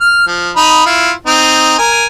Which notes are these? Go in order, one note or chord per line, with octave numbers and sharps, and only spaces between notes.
F6
F3
D#4 B5
E4 F4
C4 D#4
A#4 G#5